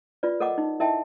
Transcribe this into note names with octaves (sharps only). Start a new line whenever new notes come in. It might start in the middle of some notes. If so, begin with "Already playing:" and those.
F4 B4 D5
A4 A#4 D#5 F#5 D6
D#4
E4 A#4 D#5 E5 G5 A5